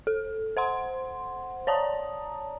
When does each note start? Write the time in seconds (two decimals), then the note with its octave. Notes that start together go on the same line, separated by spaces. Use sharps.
0.07 A4
0.57 C5 F#5 C6
1.67 C#5 D5 A5 A#5 D#6